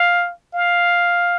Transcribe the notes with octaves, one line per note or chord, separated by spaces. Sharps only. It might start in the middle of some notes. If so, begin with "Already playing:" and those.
Already playing: F5
F5